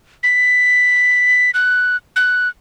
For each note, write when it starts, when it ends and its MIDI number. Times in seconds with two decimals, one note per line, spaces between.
0.23 1.51 95
1.54 1.96 90
2.16 2.48 90